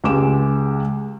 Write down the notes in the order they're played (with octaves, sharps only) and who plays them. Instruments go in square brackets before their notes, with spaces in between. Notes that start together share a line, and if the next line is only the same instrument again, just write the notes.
[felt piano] C#2 G#3 G4 D6 E7